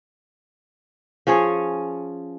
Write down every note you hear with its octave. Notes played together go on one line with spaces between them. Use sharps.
F3 C#4 G#4 C#5